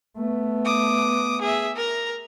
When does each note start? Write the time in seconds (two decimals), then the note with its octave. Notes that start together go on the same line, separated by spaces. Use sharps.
0.17 A3 B3
0.65 D6 D#6
1.42 G#4 E5
1.76 A#4 A#5